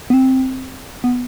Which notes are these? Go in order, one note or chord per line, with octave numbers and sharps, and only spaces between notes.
B3
C4
B3